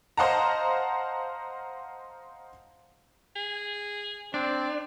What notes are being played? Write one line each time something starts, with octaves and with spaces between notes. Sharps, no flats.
C5 D#5 F5 F#5 A5 A#5
G#4
C4 D4 D5